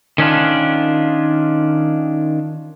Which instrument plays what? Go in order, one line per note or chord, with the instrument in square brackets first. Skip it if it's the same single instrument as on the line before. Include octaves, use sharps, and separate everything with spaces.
[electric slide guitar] D#3 C#4 D4 F4